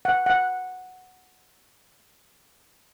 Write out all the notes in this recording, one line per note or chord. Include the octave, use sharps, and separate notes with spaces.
F#5
F#5